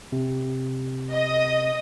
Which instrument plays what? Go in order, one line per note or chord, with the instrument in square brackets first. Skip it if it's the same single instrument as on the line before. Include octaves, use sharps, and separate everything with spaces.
[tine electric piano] C3
[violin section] D#5 D#6